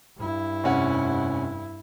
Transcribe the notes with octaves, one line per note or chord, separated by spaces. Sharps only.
G2 E4
F1 C#4 F#5